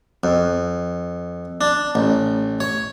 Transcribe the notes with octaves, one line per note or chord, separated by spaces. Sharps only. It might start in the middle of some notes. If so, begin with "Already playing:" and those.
F2
D4
A1
C#5